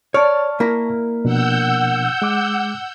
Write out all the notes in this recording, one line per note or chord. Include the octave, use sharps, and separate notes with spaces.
C#5 D5 A5 C#6 F6
A#3 E4 A#4
B2 F3 D4 F#5 E6 G6
G#3 D6